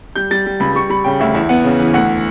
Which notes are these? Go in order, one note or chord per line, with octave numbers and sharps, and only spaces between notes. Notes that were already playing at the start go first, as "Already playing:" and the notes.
G3 G6
G3 A6
G3
C#2 B5
G3 C#6
G3 B5
C#3 G5
D2 E5
E2 E5
B3 F#5
C#3
E3
D2 F#5